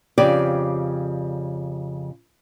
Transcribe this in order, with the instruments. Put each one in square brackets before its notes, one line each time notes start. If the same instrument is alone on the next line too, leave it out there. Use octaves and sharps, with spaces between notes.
[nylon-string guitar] F2 C#3 G4 D5